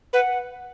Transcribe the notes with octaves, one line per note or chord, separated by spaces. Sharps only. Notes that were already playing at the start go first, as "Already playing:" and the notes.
B4 F#5